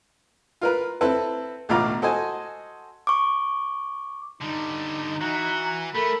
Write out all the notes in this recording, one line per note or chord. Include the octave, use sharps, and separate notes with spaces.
F4 A#4 B4
C4 E4 A4 B4
A1 D2 B2 F4 A#5 D6
F#4 A4 C5 D#5 G#5
C#6 D6
D3 G3 D#4
E3 F#4 A#5
A3 A4 A#4 B5